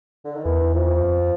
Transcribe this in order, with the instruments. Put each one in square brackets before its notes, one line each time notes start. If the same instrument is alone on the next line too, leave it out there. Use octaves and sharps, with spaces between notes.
[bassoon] D3
D#3
[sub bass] E2 [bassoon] E3
[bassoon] F3
[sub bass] F2